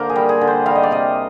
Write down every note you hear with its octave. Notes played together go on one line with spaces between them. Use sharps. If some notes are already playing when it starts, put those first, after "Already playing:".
Already playing: D3 A#3 A#4 C5 D5
G#4
G3
G#4
D3
C5
G3 F5
D#5
D5
C3 D#5